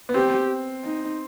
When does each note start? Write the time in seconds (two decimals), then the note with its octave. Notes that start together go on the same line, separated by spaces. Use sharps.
0.09 B3
0.14 C4 G4
0.85 D#4